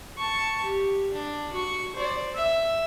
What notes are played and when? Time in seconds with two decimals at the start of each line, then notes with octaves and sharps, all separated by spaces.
0.18 A5 C#6
0.62 G4
1.13 D4
1.53 F#4 C#6
1.95 C5 D5
2.35 E5